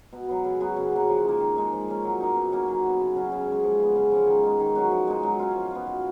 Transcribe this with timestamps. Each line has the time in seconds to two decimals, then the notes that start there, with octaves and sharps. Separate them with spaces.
0.13 B2
0.28 F#3 B3
0.44 C#3
0.60 F#3 B3 F#4
0.76 C#3
0.92 F#3 A#3
1.08 F3
1.25 A#3 D#4
1.40 D#3
1.56 G#3 D#4
1.72 F3
1.88 A#3 C#4
2.04 F#3
2.20 A#3 D#4
2.36 B2
2.52 A#3 C#4 F#4
2.68 F#3
2.84 B3 F#4
3.00 C#3
3.16 F#3 C#4
3.32 C#3
3.47 G#3 C#4
3.63 F3
3.80 B3 F4
3.96 C#3
4.12 F3 G#3 C#4
4.27 D#3
4.43 G#3 D#4
4.59 D#3
4.75 F#3 C#4 F#4
4.91 F3
5.07 G#3 D#4
5.23 F#3
5.39 C#4 F4
5.56 F3
5.71 B3 F4
5.87 B2